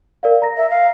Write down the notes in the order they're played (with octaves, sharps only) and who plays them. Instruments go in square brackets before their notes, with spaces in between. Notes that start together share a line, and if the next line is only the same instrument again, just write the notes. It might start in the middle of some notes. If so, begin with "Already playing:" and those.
[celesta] A#4 D5 F5
A#5 A#6
[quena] E5
F5